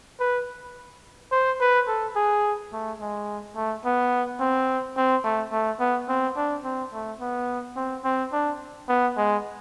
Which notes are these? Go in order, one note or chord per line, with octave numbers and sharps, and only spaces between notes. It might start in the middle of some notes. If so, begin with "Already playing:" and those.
B4
C5
B4
A4
G#4
A3
G#3
A3
B3
C4
C4
A3
A3
B3
C4
D4
C4
A3
B3
C4
C4
D4
B3
G#3